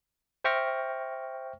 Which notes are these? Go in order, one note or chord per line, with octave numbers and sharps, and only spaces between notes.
C5 E5 G5 C#6 F6 A#6